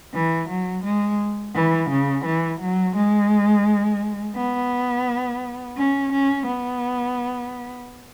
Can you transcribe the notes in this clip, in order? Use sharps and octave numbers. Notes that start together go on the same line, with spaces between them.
E3
F#3
G#3
E3
C#3
E3
F#3
G#3
B3
C#4
C#4
B3